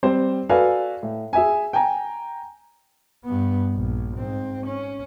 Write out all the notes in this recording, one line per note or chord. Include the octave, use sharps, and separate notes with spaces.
G3 C4 C5
F#4 A4 B4 D5 F5 G#5
A2
G#4 E5 G#5
G5 G#5 A#5
G2 B3
A#1
G#2 C4
C#4